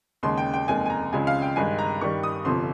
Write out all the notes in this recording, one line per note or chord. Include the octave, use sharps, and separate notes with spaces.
D#2 C#3 G#3 C6
G5
G5
F1 D#2 D#3 G#3 G#5
G#5
A#5
C#2 C#3 F3 G#3 G#5
F5
G5
G2 D#3 G#3 G#5
A#5
G2 D#3 G3 C#6
D#6
G1 F2 C3 F3 C6